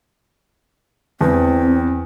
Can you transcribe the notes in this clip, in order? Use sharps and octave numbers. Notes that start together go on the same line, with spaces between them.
E2 C4